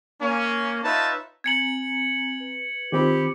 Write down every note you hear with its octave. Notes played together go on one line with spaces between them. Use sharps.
A#3 C#4
D#4 F4 B4 C#5 E5 A5
C4 G#5 A#5 G#6 C#7 F#7
B4
D#3 C4 D#4 F4 G4 B5 D#6